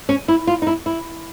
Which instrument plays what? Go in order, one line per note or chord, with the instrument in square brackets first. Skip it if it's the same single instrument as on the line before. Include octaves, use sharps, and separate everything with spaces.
[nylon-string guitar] C#4
E4
F4
D#4
E4
E4